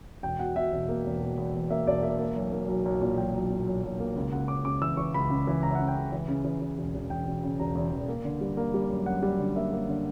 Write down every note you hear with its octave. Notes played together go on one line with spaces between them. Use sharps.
E1 G5
B2 F#5
B2 E5
E1
A#3
E1
B2
E2
E2
A#3 E5
E1 D5
A#3 E5
A#3
B1
A#3
B1
B1
A#2
B1 G5
B1
A#2
B1
B1
A#3
C#2
C#2 F#5
C#3 D6
C#2 D6
E3 E6
E3 C#6
C#2 B5
C#2
E3
C#2 A#5
E5
C#3 F#5
G5
C#2
E3
C#3
E3
E3
E1
E1
E1 G5
E1
C#3
E1 A#5
E2
E1
A#3
D3
G3
A#3
G3
F#2
F#2 F#5
G3
D3
A#3 E5
A#3
D3